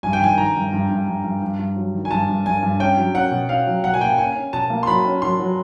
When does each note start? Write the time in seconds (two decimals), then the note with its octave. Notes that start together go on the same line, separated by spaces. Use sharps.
0.03 G2 G#5
0.13 G5
0.21 D#3 G#5
0.38 D#3 A#5
0.55 G2
0.73 G2
0.90 G2
1.07 G2
1.24 G2
1.42 G2
1.59 G2
1.76 F#3
1.94 D#3
2.05 G#5
2.11 G2 A5
2.28 G2
2.45 G2 G#5
2.62 G2
2.80 C#4 G5
2.97 F#3
3.14 C#4 F#5
3.31 B2
3.49 C#4 F5
3.67 F#3
3.84 B2 F#5
3.94 G#5
4.01 A#3 G5
4.18 C#4 G#5
4.36 C#4
4.53 B2 A5
4.70 A#3
4.83 C6
4.87 F#3 B5
5.05 C#4
5.22 F#3 C6
5.39 F#3